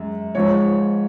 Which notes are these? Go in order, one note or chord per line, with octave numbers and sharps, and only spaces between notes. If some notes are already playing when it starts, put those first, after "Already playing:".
Already playing: F#2 G#3
G#2 F3 G#3 C#5